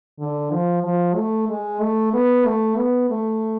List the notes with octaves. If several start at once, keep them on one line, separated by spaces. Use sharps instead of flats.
D3
F3
F3
A3
G#3
A3
B3
A3
B3
A3